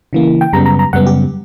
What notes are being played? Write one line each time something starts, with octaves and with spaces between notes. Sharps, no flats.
C#3 E3 A#3
G5
F#2 C#3 G3 B3 A#5
A#5
A#5
F#2 C#3 G3 B3 F#5
G4